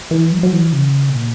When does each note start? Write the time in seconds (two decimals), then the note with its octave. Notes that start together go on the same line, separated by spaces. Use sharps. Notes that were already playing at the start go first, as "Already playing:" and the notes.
0.11 E3
0.32 F#3
0.43 F#3
0.52 E3
0.73 C#3
1.09 B2
1.14 A#2